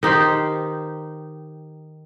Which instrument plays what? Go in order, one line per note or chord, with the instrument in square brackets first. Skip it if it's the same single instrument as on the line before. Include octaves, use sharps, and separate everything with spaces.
[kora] D#3 D#4 G4 C5